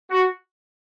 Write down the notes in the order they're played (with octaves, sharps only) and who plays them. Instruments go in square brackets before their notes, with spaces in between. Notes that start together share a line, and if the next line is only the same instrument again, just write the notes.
[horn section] F#4